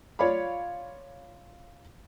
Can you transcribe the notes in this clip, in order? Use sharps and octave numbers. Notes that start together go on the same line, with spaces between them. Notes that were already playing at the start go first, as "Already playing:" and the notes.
F4 C#5 D5 F5 B5